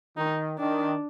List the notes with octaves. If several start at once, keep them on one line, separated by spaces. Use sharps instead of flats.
D#3 D#4
D#3 D4